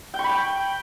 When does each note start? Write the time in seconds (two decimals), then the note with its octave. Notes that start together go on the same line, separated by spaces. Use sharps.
0.14 G5
0.19 C#6
0.24 B5
0.29 G5